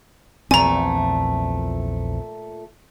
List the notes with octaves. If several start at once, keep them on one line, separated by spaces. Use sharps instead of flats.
A#1 E2 A#2 A3 C4 G#5 A#5